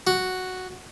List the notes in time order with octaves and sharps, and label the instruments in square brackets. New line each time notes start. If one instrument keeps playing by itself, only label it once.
[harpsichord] F#4